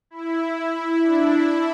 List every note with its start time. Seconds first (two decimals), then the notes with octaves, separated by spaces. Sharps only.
0.10 E4
0.73 E4
1.03 D4
1.33 E4